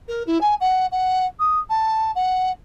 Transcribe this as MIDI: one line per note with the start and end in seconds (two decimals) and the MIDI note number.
0.08 0.23 70
0.26 0.40 64
0.41 0.55 80
0.60 0.86 78
0.91 1.26 78
1.39 1.59 87
1.69 2.11 81
2.15 2.51 78